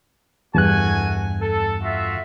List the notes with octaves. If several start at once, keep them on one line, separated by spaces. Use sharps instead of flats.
E2 G2 A3 F#4 G#5 F#6
A4
F4 F#4 E5